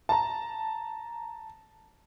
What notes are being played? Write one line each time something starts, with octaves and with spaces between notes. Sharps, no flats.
A5 A#5